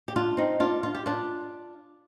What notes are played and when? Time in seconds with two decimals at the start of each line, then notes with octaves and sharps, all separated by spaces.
0.08 G4
0.16 D4 F4
0.37 C4 D#4
0.60 D4 F4
0.83 F4
0.95 G4
1.06 D4 F4